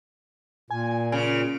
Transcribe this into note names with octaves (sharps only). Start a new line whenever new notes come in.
A#2 G#5
C#3 D7